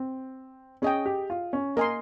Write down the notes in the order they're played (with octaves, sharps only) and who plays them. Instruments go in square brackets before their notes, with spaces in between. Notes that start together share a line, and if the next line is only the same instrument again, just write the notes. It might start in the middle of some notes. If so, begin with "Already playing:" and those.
Already playing: [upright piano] C4
[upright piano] C#4 [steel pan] G#4 D#5 G5
[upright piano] G4
F4
C#4
[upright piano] A#3 [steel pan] A#4 D#5 G#5 C6